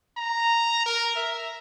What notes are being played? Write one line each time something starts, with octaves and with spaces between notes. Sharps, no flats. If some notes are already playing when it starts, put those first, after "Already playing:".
A#5
A#4
E5